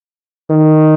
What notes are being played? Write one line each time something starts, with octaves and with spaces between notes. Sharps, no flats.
D#3